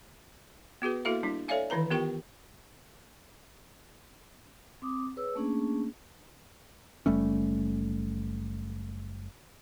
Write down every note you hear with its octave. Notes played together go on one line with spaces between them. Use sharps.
B3 F#4 G#4 B4
A#3 E4 F#4 A4 E5 F5
G3 D4 E4
A4 C#5 D5 E5 F5 G#5
D#3 E3 E4 B4 A#5
B3 F4 G4 A#4 G5 C#6
C4 D6 D#6
G#4 B4 C#5 E6
A3 A#3 C#4 D4 G#4
F#1 G3 A3 C#4